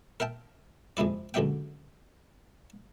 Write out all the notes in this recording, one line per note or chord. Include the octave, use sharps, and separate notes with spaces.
A#4 E5 G5 A5
F2 C3 G#3 E4 D5
C#2 D3 F#3 C#4 E5 G5